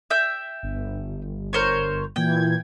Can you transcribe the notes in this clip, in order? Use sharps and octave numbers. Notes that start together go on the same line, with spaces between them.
E5 G5
G1
A#4 C5 C#5
A#2 E3 G5 G#6